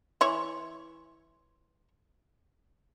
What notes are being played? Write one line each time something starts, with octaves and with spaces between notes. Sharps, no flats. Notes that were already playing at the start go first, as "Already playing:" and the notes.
E3 E4 C#5 C6